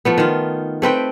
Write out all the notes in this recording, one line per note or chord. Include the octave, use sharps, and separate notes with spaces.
F3 A3 B3
D#3 F4
A3 C4 B4 G5